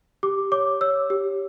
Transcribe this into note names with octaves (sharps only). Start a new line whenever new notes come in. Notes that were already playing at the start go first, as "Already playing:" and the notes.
G4 D6
C#5 D6
C#5 E6
G4